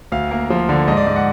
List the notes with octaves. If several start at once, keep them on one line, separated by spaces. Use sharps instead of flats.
D2 F5
A#3
F3
D3
G#2 D#5
D5
G#2 D#5
F#5